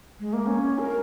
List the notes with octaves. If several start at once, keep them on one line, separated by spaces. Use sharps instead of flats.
G#3
A#3
C#4
A#4